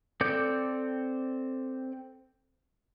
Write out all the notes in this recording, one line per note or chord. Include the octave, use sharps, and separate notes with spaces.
C4 A4 D5 D6 G6